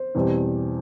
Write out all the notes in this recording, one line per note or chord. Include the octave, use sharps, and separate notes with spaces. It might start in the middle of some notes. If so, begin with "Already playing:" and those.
Already playing: C5
E2 B2 G3 C4